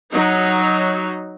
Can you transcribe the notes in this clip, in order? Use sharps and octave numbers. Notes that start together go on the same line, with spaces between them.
F#3 D#4